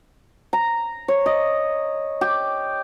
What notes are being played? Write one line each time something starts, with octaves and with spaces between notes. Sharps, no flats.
A#5
C#5
D#5
G4